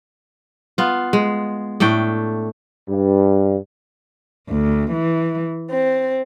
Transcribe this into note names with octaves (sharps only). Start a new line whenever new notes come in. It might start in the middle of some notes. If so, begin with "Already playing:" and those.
B3 F4
G#3
A2 A3 D4 G5
G2
D2
E3
C4